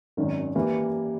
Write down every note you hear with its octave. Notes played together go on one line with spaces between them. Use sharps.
G#1 F#2 D#3
E3 G3 A#3